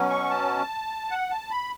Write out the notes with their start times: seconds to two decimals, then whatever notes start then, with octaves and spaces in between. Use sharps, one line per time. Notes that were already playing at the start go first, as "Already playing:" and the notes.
Already playing: B2 F#3 C#4
0.10 C#6
0.30 A5
1.10 F#5
1.30 A5
1.51 B5